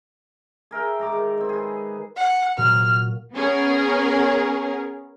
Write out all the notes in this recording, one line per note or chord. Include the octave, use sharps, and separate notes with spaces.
G#4 A#4 E5 G5
G#2 A#5 D6
D#3
D#3 C4
G#4 B4
F#5
A#2 F#3 F6
B3 C#4 G#4 A#4